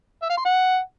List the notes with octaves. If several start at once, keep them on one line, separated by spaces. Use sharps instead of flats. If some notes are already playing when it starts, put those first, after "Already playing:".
E5
F5
C6
F#5